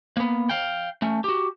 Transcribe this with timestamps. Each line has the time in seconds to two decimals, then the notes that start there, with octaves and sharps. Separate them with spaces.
0.17 A#3 B3
0.49 F5 G5
1.02 A3 C#4
1.24 F#4 G4